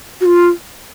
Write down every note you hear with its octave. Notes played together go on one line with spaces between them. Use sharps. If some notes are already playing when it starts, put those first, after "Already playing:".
F#4
F4